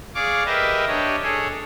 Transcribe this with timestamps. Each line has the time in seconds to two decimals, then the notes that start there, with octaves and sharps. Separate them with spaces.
0.15 G#4 D5 F5 C#6 D6
0.46 G4 A#4 B4 D#5 E5
0.87 D4 G4 C#5 D#5
1.23 G#4 A4 C#5